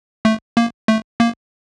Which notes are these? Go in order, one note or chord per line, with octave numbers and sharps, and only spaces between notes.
A3
A#3
A3
A#3